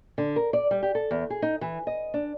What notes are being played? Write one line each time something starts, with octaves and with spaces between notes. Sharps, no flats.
D3
A#4
D5
G3
G4
A4
E2
G#4
D#4
E3
D#5
D4